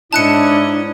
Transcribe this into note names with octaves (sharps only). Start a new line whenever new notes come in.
G#2 C#4 D4 E4 D#5 A5 F#6 C#7